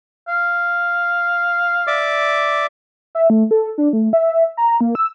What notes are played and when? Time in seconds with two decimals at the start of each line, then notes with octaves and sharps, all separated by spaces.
0.28 F5
1.87 D5 E5 D6
3.15 E5
3.30 A3
3.51 A4
3.78 D4
3.93 A3
4.13 E5
4.57 A#5
4.81 A#3
4.95 E6